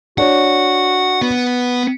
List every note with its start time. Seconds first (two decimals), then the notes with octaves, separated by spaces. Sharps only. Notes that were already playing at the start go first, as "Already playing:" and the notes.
0.18 D4 F#4 C#5 F#5
1.22 B3